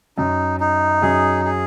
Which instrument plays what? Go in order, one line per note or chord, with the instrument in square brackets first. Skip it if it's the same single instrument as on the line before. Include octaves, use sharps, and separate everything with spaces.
[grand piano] F#2 F#3 [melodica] D#4
[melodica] D#4
[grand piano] F#2 F#3 [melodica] G#4
[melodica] G#4